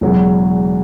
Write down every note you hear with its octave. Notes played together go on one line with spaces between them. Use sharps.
E1 E2 C#3 F#3